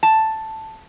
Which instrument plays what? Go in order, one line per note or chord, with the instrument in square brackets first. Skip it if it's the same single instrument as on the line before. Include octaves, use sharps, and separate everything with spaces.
[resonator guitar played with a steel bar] A5